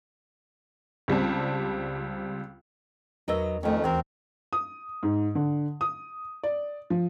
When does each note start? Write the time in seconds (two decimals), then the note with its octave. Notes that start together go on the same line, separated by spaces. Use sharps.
1.08 C#2 G3 C4 A5
3.28 E2 F#3 B3 A#4 D#5 E6
3.63 F2 D#3 A3 C#4
3.84 D#2 E3 A3 C4 F#4 A#4
4.53 D#6
5.03 G#2
5.35 D3
5.81 D#6
6.43 D5
6.90 F3